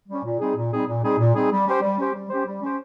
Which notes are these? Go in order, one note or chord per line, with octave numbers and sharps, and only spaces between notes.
G3 C#4
A#2
G3 C4 D#4 G#4
A#2
G3 C4 D#4 G#4
A#2
G3 C4 D#4 G#4
A#2
G3 C4 D#4 G#4
G3
C#4 G4 C5
G3
C#4 G4 C5
G3
C#4 G4 C5
G3
C#4 G4 C5